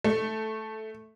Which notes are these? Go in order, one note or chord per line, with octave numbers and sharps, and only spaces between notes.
A3